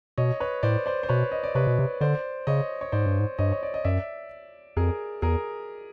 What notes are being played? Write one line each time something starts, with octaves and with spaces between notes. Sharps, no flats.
B2 C#5 D#5
B4 C#5
A2 C5 D5
C5 D5
C5
B2 B4 C#5
D#5
D5
C3 B4 C#5
B2
C3
D3 C5 D5
C#3 C#5 D#5
C#5
G#2 C5 D5
G2
G#2
G2 C#5 D#5
C#5
D5
D#5
F#2 D5 E5
F2 G#4 A#4
E2 G#4 A#4